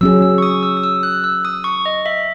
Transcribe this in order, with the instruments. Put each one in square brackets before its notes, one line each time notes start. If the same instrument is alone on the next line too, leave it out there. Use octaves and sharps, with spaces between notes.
[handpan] F#3 C#4 G#4 [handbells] E6
[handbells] E6
C#6
D#6
E6
D#6
E6
F#6
E6
D#6
C#6
D#5
E5